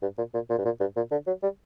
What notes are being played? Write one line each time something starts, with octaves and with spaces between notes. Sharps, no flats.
G2
A#2
A#2
A#2
G2
A#2
G2
A#2
D3
F#3
G3